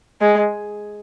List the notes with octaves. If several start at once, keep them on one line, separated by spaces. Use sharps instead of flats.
G#3